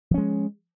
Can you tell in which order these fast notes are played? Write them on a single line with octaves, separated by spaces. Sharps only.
F3 C#4 G#3